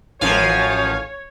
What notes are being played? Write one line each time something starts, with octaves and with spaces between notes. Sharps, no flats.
A1 F#2 F3 C#5 F5 G#5